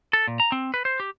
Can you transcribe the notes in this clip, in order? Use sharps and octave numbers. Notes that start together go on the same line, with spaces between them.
A4
A#2
A#5
C4
B4
C5
G4